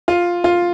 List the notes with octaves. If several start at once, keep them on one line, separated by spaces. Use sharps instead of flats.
F4
F4